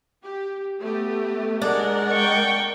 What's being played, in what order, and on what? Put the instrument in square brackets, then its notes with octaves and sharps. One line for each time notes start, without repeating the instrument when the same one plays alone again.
[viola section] G4
A3 B3 G4
[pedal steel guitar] G#3 [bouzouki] D4 [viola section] A#4 D5 F#5
[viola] G5 C#6